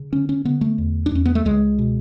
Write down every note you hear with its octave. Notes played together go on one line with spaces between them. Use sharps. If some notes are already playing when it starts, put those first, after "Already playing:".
Already playing: C#3
D3 C#4
C#4
D3 B3
A3
E2
D4
E2 C#4
B3
A3
C#2 G#3
B2